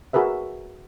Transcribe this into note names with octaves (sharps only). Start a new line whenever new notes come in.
F#4 G#4 A#4 B4 E5